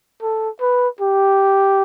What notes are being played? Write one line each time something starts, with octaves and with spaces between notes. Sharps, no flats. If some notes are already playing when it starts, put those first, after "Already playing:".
A4
B4
G4